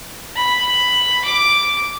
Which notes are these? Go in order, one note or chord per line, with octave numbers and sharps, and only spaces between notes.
B5
D6